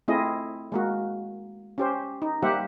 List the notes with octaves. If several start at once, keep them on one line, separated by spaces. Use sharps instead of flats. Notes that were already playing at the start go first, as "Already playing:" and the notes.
A3 C4 E4 F4 G#4 D#5
G#3 A#3 F#4
C#4 G4 C5
D#4
G3 A#3 G4 C5 E5 F#5